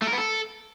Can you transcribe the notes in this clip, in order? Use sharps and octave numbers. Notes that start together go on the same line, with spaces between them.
A3
A#4
B3
A4